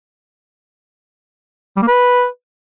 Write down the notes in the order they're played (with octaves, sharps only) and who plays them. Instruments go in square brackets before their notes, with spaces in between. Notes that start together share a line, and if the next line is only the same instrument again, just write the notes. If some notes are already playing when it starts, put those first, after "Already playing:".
[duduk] G3
A#3
B4